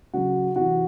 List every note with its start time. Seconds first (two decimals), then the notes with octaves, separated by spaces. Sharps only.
0.14 C#3 F#3 F#4
0.56 C3 E3 F#4